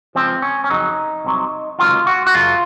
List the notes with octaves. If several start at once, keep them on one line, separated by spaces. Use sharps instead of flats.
C#2 C#3 F3 C4
C#4
C#4
F2 C#3 F#3 D#4
C2 C3 F#3
C#2 C3 D#3 F#3 F4
F#4
F#4
F#2 C#3 F#3 F4